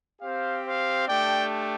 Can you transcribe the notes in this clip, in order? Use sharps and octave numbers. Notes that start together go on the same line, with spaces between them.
C4 G4 C5 F5
C5 F5
A3 D4 G4 D5 G5